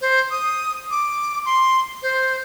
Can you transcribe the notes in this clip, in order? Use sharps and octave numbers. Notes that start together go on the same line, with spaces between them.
C5
D#6
D6
C6
C5